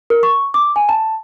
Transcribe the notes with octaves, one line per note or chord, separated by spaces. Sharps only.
A#4
C#6
D6
G#5
A5